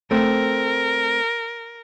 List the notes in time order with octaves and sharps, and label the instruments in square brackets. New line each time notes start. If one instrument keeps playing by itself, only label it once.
[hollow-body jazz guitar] A3 C4 [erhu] A#4